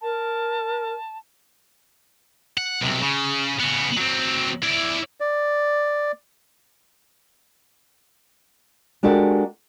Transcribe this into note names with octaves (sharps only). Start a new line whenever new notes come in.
A#4 A5
F#5
B1 C3
C#3
C#3 B3
F#3 C4
E4 D5
D5
G#3 D4 F#4 G4 A4 A#4